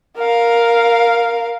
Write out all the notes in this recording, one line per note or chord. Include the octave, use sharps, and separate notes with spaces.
A#4 F5